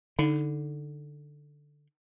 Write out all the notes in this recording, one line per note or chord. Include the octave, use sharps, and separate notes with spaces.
D3 D#4